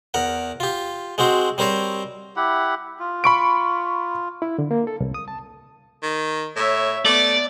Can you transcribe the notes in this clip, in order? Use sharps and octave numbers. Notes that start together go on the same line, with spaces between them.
E2 A#4 F#5
F4 G4
G#3 C4 F#4 C5
G3 C4 A#4 C5 C#5
E4 G4 F#5
F4
B5 C#6 D7
E4
D3
A#3
A4
C2
D#6
A5
D#3
A2 C#5 E5
A3 B3 D5 D6